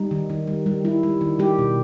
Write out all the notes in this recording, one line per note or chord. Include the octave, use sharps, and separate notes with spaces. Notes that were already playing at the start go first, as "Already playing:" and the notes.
Already playing: G3 D#4
D#3
D#3
G3
G3
G3 E4
G3
D#3
G3 G4
B2